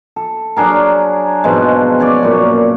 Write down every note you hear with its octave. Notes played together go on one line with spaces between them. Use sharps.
A4
F#3 D4 G#4 A#4
G#2 B2 F3 G#3
C#4 C#5 D5
F#2 A#2